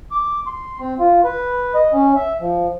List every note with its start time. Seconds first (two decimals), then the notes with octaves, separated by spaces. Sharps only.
0.11 D6
0.47 C6
0.80 C4
0.99 F4
1.24 B4
1.74 D#5
1.93 C#4
2.16 E5
2.41 F3